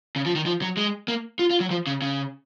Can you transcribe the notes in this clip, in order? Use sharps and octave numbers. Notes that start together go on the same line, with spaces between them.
C#3
F3
D#3
F3
F#3
G#3
A#3
F4
F4
F#3
F3
C#3
C#3